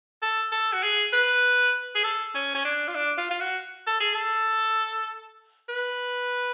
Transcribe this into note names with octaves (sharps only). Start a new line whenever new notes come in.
A4
A4
F#4
G#4
B4
G#4
A4
C#4
C#4
D4
F4
D4
F4
F4
F#4
A4
G#4
A4
B4